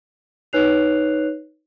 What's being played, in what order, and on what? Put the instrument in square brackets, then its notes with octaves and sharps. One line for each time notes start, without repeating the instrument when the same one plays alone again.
[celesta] D#4 B4 C#5 F#6 C7 F7